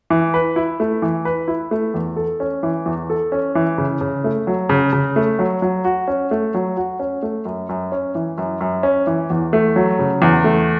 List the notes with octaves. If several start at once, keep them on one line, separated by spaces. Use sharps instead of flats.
E3
B4
E4
A3
E3
B4
E4
A3
E2
A4
C#4
E3
E2
A4
C#4
E3
C#3
C#3
A3
F#3
C#3
C#3
A3
F#3
F#3
F#4
C#4
A3
F#3
F#4
C#4
A3
F#2
F#2
C#4
E3
F#2
F#2
C#4
E3
E2
A3
F#3
C#3
E2
A3